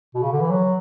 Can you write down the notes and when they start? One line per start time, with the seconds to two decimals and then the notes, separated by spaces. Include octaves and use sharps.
0.15 B2
0.23 C#3
0.32 D3
0.41 E3
0.50 F#3